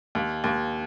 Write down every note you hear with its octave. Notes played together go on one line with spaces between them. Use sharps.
D#2
D#2